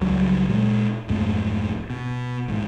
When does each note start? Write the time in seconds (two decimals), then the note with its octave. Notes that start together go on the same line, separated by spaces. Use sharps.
0.01 C#2 F#3 G3
0.49 A#2 G#3
1.08 B1 F2 G#2 A3
1.90 B2
2.48 A1 G#2